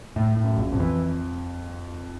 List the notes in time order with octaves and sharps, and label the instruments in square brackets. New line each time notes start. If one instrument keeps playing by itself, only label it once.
[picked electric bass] A2
A2
[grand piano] F#2
[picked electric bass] A#1
[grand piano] F2
[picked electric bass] E3